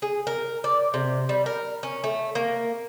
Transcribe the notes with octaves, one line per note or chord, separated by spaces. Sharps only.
G#4
A#4
D5
C3
G3
A#4
C#4
A3
A#3